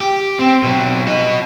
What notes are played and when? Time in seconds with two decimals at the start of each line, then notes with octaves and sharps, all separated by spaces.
0.01 G4
0.39 C4
0.63 B2 F#3
1.07 F#4 D#5